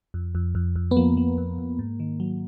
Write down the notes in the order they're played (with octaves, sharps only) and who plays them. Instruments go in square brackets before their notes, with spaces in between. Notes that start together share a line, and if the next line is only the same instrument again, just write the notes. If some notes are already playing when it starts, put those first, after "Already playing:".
[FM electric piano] F2
F2
F2
F2
B3
F3 A#3
F3
F2
F2
G#2
D#3
F#3